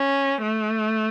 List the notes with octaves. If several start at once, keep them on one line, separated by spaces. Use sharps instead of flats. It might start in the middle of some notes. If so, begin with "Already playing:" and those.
Already playing: C#4
A3